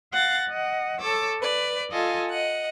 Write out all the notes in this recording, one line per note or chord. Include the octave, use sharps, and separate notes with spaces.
F5 F#5 A6 A#6
D#5 F#5
A4 C#5 D6 E6
B4 D5
F4 A4 D#5 F5 G#5
D#5 F#5